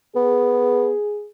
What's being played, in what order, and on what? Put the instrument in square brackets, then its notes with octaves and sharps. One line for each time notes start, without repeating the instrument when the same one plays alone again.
[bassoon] B3 [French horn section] G#4